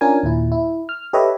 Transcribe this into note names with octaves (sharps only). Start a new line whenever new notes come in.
C#4 D4 F4 A#4 G#5
D#2 A#2 E4
E4
F6
G4 A4 B4 C#5 D#5 E5